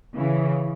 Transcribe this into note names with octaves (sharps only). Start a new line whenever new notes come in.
C#3 E3